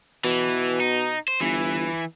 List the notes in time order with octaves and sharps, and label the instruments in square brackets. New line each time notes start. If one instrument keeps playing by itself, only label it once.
[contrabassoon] B2 [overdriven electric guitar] E3
[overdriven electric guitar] D#4
C5
[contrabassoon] G1 [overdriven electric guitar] E3